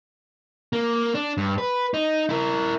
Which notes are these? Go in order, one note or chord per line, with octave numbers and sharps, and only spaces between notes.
A#3
D4
G2
B4
D#4
E4 A#4